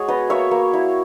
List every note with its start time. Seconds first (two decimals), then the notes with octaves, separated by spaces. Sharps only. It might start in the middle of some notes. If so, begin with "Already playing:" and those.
Already playing: G#3 F#4 G#4 C#5
0.08 B3 B4 D#5
0.30 A#3 C#5 E5
0.51 A#3
0.73 E4